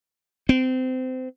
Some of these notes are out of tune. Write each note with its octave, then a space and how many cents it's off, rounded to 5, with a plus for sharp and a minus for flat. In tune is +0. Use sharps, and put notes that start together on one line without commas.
C4 -25